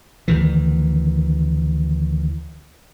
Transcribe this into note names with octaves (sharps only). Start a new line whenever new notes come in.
D2 D#3 E3